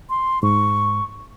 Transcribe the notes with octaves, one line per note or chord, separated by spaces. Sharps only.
C6
G#2 C#6